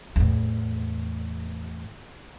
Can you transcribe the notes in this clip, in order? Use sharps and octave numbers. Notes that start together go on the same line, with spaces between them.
E2 A2